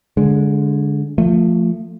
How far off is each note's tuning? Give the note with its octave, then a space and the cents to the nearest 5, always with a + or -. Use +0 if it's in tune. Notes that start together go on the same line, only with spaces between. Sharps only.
D3 -20 G#3 +0
F3 +0 A3 +25